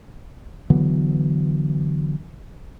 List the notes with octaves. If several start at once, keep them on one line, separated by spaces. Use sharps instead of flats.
D3 E3 F#3 B3